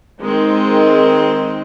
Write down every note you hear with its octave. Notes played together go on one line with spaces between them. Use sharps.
D#3 G#3 C4